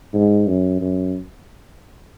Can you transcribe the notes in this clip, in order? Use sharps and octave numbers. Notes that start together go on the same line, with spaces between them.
G#2
F#2
F#2